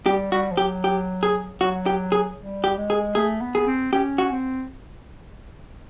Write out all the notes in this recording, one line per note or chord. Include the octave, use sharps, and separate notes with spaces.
G3 G4
G3 F#4
F3
F#3 G4
G4
G#4
F#3 F#4
G4
G#4
G3
G4
G#3
G#4
A3 G#4
B3
G#4
C4
C#4 G4
F#4
C4